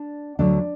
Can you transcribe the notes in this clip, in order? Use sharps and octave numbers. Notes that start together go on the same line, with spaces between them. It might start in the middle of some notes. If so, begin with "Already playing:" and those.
Already playing: D4
D2 D3 F#3 D4